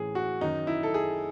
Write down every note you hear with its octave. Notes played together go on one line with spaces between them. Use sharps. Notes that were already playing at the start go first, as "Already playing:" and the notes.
Already playing: A2 E3 G#4
F#4
F#2 D#3 D#4
E4
A4
G#4